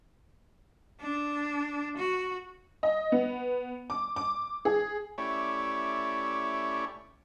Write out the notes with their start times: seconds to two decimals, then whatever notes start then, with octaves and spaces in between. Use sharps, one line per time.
1.01 D4
1.97 F#4
2.83 D#5
3.12 B3
3.90 D6
4.16 D6
4.65 G#4
5.18 A3 C#4 E4 G4 C#5 D5